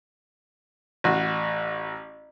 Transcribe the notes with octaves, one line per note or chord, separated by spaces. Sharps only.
A1 F#4